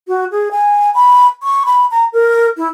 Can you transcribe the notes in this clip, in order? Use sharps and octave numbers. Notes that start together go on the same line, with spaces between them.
F#4
G#4
G#5
B5
C#6
B5
A#5
A#4
E4